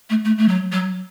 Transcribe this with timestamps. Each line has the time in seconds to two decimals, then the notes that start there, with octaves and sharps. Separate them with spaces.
0.10 A3
0.25 A3
0.38 A3
0.48 F#3
0.72 F#3